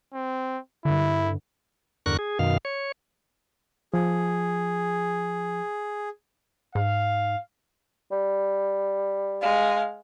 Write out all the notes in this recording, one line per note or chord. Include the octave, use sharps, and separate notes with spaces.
C4
G2 D3 E4
E2 G2 D3 A#4 C#6 F#6
G#4
F#2 B2 D#3 F5
C#5
F3 G#4
G#2 F5
G3
G#3 F5